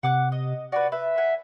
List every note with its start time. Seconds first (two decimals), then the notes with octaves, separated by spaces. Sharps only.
0.03 C3 F#5 D6 F#6
0.32 D#5
0.72 F#4 B4 D5
0.92 B4 E5
1.18 F#5 G#5